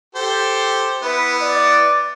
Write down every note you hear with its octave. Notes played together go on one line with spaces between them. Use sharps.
G4 A4 C5
B3 E4 B4
D5